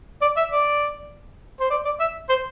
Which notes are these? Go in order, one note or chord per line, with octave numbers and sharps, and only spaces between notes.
D5
E5
D5
C5
D5
D5
E5
C5